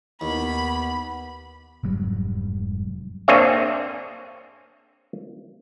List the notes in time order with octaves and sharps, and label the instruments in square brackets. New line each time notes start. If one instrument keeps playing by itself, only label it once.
[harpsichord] D#2 [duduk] B3 [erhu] B5
[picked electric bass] F1 G#2 F#3 G3
[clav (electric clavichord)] A#3 C4 D4 G#4 C#5 E5